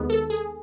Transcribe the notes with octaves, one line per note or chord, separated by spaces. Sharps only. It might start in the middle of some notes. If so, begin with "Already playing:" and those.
Already playing: D#2 D#3 G#3 B3
A4
G#4